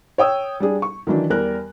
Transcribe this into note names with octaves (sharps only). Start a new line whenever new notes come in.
C#5 G5 D#6 E6
G3 D4 G#4
C#6
D#3 E3 F#3 D4
E2 G3 A#4 F#6